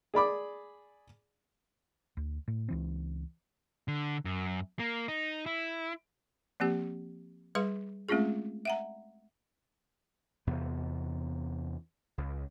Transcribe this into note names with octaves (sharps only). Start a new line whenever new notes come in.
G#4 D5 B5 D6
D2
A2
C#2 E3 C4
D3
F#2
A#3
D#4
E4
F3 A#3 C4 G4
G3 G#4 B4 F5 C6
G#3 A3 C4 C#4 F4 G#4
E5 F#5 A#5
E2 C3 B3
C#2